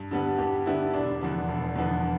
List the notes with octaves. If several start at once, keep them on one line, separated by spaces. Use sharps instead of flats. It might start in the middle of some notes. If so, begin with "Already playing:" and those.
Already playing: G2
D3 G3 B3
G2 G4
D3 G3 B3 E4
E1 D4
E2 D3 F3 B3
E1
E2 D3 F3 B3